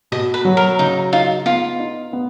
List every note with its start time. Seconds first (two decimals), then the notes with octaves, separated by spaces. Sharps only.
0.12 B2 D#5
0.34 B4
0.45 F#3
0.57 A#4
0.79 C#3 D#4
1.13 D#4 F4
1.46 B3 F4
1.79 D#4
2.13 B3